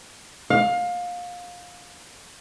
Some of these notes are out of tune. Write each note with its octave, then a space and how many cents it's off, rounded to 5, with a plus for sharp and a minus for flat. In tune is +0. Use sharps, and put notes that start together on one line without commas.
F5 +25